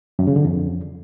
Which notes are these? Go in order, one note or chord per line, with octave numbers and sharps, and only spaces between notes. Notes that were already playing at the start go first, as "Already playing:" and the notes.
F#2
C#3
D3
F2